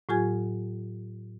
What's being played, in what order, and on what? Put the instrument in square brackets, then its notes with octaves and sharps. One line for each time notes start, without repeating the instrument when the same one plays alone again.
[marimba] A2 F#3 F4 G4 G#5 G#6